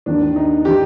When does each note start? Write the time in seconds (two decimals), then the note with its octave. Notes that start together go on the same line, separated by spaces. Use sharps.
0.06 D#2 D#3 D4
0.36 D#4
0.65 D#3 G4